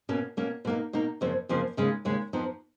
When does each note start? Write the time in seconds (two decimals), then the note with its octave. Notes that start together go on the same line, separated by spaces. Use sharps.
0.09 B2 A#3 C#4
0.37 B2 A#3 C#4
0.65 B2 A#3 D#4
0.93 B2 A#3 D#4
1.21 F2 C#3 F3 A#3
1.49 F2 C#3 F3 A#3
1.77 D#2 C#3 G#3
2.05 D#2 C#3 G#3
2.33 F2 F3 B3 D#4